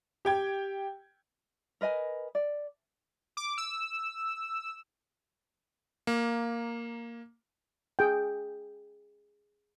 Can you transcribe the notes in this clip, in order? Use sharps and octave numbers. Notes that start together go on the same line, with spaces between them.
G4 G5 G#6
A#4 B4 D#5 G#5
D5
D6
E6
A#3
G#4 G5